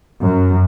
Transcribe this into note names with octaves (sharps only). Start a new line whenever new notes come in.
F#2